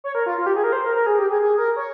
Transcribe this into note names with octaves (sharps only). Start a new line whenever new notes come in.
C#5
A#4
F4
F4
G4
G#4
A#4
C5
A#4
A#4
G#4
G4
G#4
G#4
A#4
C#5